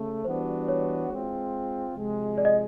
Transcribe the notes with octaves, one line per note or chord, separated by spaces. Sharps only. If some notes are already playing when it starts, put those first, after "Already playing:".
Already playing: C#3 A3
E3 G3 B3 D4 F#4 C5
C#5
G#3 C4 F4
C3 F3 G#3
D5
D#5